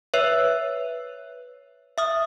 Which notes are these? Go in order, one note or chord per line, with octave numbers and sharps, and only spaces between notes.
B4 C#5 E5
E5 D#6 F6